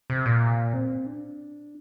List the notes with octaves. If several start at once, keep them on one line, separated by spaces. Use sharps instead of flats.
C3
A#2
C4
D4